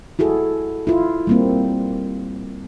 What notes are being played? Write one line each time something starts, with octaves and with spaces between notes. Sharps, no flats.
E4 F#4 G#4 A4
E4 F4
G3 A#3 C4